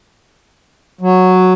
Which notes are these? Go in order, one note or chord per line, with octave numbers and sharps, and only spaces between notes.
F#3